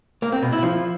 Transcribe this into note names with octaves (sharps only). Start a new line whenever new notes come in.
A#3
C4
B2
E4
F3